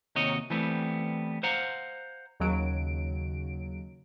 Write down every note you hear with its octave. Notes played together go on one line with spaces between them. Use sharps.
D#2 C3 D#4 F#4 C#5 D#5
E3 G3 A3 B3 C4
C5 F5 F#5 A#5
D#2 C#3 F#3 D7